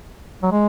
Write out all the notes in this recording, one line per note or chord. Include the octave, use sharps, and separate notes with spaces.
F#3
G#3